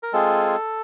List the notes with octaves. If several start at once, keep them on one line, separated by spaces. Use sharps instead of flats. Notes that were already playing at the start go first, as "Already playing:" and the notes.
A#4
G#3 C4 F4 G#4 A4